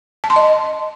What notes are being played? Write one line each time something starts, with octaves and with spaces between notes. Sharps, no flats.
A5
C6
D#5